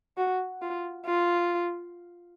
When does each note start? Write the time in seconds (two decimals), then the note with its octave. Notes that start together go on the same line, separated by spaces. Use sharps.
0.17 F#4
0.62 F4
1.06 F4